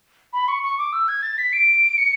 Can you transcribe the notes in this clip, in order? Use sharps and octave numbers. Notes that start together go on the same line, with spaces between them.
B5
C#6
C#6
D6
E6
G#6
A6
B6
D7
C#7